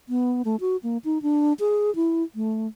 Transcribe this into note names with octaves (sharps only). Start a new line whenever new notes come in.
B3
A3
F#4
A#3
D#4
D4
G#4
E4
A3